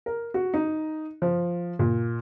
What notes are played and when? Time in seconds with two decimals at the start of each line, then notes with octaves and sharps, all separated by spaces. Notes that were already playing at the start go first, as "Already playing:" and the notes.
0.06 A#4
0.34 F#4
0.54 D#4
1.22 F3
1.79 A#2